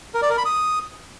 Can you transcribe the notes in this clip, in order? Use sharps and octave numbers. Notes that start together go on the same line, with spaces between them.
A#4
D5
A#4
B5
D#6